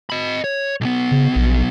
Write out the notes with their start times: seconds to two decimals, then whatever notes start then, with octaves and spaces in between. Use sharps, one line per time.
0.10 D#5 B5
0.44 C#5
0.81 B1 B3
1.11 C#3
1.36 A#1